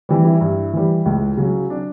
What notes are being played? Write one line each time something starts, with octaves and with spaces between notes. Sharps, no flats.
E3 G3 G4
E4
G2
E3 G3
C#2
C#3 F#3
D4